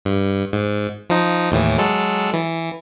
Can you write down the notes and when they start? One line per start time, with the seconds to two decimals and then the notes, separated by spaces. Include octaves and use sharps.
0.05 G2
0.53 G#2
1.10 F3 D#4
1.52 D#2 A2 E3
1.78 F#3 G#3 A4
2.34 E3